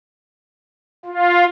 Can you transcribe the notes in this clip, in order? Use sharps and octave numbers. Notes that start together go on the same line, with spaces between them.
F4